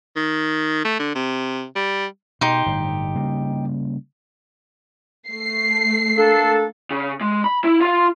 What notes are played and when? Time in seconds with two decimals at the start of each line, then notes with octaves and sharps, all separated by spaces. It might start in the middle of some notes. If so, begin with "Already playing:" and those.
0.16 D#3
0.85 A3
0.99 D3
1.15 C3
1.76 G3
2.41 B2 D#4 G4 C6
2.66 G1 A2
3.15 C#3 G3 A#3
5.28 A3 C7
6.17 A#3 D4 A4
6.91 C#3
7.21 G#3
7.44 B5
7.64 E4
7.81 F4 F5